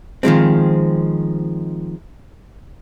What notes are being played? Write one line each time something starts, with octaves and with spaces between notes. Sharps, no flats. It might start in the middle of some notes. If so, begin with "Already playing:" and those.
D#3 F3 G#3 C4